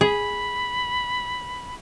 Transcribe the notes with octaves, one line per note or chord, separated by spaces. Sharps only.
G#4 B5